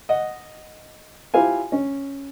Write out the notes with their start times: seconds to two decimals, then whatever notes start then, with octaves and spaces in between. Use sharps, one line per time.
0.09 D#5 F#5
1.34 E4 F4 G4 C5 F5 G#5
1.72 C#4